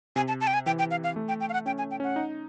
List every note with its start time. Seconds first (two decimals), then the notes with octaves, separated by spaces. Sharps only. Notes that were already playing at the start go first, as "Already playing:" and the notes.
0.16 C3 G#5
0.28 A5
0.41 A5
0.47 G5
0.54 G#5
0.66 E3 G5
0.79 G5
0.91 F5
1.04 F5
1.16 A3
1.29 G5
1.41 G5
1.49 F5
1.53 F#5
1.66 C#4 G5
1.78 G#5
1.91 G5
2.00 C#4
2.04 F#5
2.16 D#4